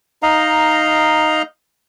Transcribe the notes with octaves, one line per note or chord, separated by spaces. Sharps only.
D#4 D#5 F5 A#5